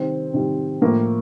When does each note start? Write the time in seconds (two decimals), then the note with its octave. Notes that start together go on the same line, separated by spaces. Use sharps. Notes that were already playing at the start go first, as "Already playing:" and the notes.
Already playing: C3 D#3 G3 C4
0.33 C3 D#3 G3
0.81 A2 F3 A#3